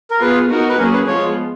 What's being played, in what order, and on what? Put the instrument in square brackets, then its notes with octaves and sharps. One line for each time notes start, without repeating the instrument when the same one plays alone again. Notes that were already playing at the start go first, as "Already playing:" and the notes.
[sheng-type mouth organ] A#4
[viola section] B3 F4 G#4 [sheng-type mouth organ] B4
[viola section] B3 D#4 F#4 A#4
[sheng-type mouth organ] B4
[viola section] F#3 A#3 C#4 G#4 [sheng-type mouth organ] A#4
[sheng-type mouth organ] B4
[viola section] F3 G#3 B3 F4 [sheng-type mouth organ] C#5